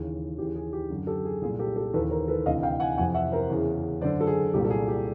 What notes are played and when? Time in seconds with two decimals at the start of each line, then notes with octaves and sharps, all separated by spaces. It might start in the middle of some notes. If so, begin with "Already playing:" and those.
Already playing: D#2 C#3 E3
0.38 D#2 C#3 E3 G4
0.56 G#4
0.73 G4
0.90 F#2 D3
1.07 G4 A4
1.25 G#4
1.41 C2 A#2 G#4
1.59 G4 A4
1.76 G4 A4
1.93 D#2 C#3 E3 A4 B4
2.11 A#4 C5
2.28 A4 B4
2.46 D2 C3 E3 D#5 F5
2.63 F5 G5
2.80 F#5 G#5
2.98 F2 C3 E3 F#5 G#5
3.14 E5 F#5
3.32 A#4 C5
3.49 E2 C#3 E3
4.01 F#2 D3 C5 D5
4.21 A4
4.27 G#4
4.54 C2 A#2 G4
4.65 A4
4.70 G#4
4.88 G4